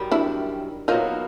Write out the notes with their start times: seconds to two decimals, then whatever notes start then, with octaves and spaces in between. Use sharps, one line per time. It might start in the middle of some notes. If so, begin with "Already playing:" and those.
Already playing: F#2 D#3 G3
0.12 D4 E4
0.88 B2 F#3 A#3 D#4 F4